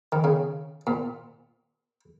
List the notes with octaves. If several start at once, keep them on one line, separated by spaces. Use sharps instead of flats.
D#3
C#3
A#2